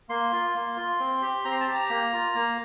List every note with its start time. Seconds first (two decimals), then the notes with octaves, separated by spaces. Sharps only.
0.09 A#3 C6
0.32 F4
0.55 A#3
0.77 F4
1.00 C4
1.22 G4
1.45 C4 A#5
1.60 A5
1.67 G4
1.74 A#5
1.90 A#3
2.13 F4
2.35 A#3